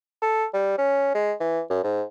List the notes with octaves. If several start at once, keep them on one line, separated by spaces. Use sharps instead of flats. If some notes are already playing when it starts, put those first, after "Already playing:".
A4
G3
C#4
G#3
E3
F#2
G#2